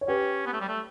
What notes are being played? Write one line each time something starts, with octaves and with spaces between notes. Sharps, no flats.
C#5
C#4 G4 B4
B3
A3
G3
A3